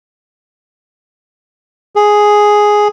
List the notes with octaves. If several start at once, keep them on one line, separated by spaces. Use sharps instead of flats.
G#4